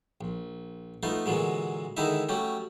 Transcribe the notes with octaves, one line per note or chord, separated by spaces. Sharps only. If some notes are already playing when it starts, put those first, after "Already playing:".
A#1
A3 B3 D#4 F4
A#2 D3 E3 F#3 G#3
D3 D#3 G#3 D#4 E4 E5
F#3 A3 C#4 G4